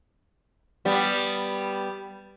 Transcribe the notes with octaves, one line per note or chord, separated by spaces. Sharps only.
G3 B3